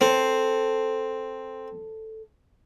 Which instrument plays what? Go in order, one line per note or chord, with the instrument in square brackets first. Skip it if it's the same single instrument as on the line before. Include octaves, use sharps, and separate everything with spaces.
[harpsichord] C4 [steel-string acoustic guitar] A4 C5